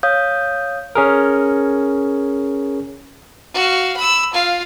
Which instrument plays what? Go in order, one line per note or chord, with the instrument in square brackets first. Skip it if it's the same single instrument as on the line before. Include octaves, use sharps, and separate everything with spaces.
[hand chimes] C#5 F5 D#6 G6
[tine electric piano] C#4 G#4 A#4
[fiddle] F#4 F5
B5 E6
F4 F5